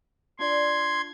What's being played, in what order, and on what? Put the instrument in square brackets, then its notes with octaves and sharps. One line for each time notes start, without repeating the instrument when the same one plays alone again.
[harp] D4 F4 D5 [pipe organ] C6 G#6